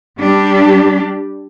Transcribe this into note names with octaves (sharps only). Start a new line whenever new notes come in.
G3 D4 G4